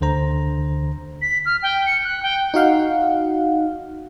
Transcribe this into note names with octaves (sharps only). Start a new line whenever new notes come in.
D2 D3 C5 A#5
B6
F6
G5
C#7
F#6
G5
D#4 F#4 F5 F#5